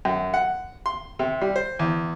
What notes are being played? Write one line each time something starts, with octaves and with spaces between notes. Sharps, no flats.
F#2
F#5
C6
C3
G3
C5
E2